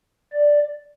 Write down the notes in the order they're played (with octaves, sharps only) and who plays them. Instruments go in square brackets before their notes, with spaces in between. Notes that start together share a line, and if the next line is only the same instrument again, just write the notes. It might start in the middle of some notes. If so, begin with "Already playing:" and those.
[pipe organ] D5